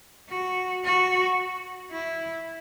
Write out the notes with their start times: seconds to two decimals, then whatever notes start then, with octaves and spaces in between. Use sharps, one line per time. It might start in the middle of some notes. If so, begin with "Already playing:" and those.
0.30 F#4
0.84 F#4
1.92 E4